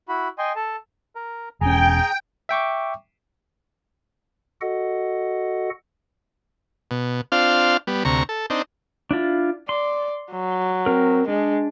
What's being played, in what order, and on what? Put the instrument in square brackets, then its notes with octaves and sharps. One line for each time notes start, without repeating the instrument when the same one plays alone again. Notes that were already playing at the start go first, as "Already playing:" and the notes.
[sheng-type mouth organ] E4 F#4 B5
D#5 G5 G#5 C6
A4 A5
[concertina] A#4
[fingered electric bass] E1 C#4 [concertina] G#4 G#5 A#5 [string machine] G5
[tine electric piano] E5 G5 C#6 D6
[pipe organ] F#4 A4 D#5 F#5
[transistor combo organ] B2
C4 D4 F4 F5
G3 B3
D2 C3 A#5 C#6
A4
C4 D4 D#4
[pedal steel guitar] D4 E4 F4
[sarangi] D5 [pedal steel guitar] C6
[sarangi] F#3
[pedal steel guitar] C4 A#4
[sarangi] G#3 [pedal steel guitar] D4